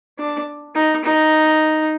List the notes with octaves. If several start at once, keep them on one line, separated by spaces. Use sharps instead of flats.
D4
D#4
D#4